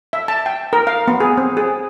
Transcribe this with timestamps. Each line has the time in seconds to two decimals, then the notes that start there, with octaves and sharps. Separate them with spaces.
0.13 E5
0.28 A5
0.46 G5
0.73 A#4
0.87 F5
1.08 B3
1.20 G#4
1.38 C4
1.57 G#4